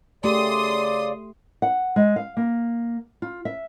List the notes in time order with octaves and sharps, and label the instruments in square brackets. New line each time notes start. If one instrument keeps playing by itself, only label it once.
[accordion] C#3 D5 [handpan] A3 G4 [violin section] C6 D#6
[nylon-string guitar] F#5
G#3
F5
A#3
F4
E5